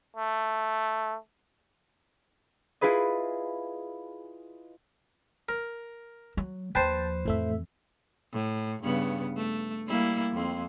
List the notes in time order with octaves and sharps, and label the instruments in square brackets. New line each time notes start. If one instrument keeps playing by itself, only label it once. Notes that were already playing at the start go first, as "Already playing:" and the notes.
[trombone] A3
[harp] E4 F4 G#4 B4 D#5
[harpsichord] A#4
[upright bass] F#3
[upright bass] D#2 F3 [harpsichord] B4 C5 [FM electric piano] G5 A5
[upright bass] F2 E3 [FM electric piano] A2 A3 E5
[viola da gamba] A2
G2 C#3 B3
A3
G3 A#3 E4
F2 C4